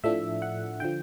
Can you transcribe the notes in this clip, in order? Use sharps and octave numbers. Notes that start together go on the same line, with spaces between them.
A2 F3 A3 D4 E5
F#5
D3 F3 G5